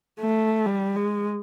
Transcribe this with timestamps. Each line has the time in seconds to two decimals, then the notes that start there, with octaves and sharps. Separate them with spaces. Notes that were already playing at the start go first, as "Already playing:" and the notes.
0.20 A3
0.67 G3
0.96 G#3